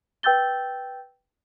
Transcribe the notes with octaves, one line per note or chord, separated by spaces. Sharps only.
B4 G5 E6 G6 A6 G7